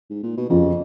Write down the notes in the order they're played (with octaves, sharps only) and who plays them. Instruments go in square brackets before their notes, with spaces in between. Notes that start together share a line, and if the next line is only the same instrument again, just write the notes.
[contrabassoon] G#2
A#2
B2
[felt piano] F2 [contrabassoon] C#3